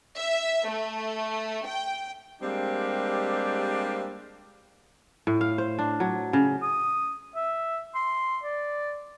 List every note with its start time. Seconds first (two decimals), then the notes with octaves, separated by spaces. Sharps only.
0.16 E5
0.69 A3
1.67 G5
2.42 G3 G#3 A#3 C4 D4 G4
5.27 A2
5.41 F5
5.58 C5
5.79 D4
6.00 F#3
6.33 C#3
6.62 D#6
7.36 E5
7.95 C6
8.44 D5